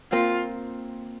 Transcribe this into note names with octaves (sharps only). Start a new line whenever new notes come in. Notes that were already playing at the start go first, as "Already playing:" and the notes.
A#3 C4 F4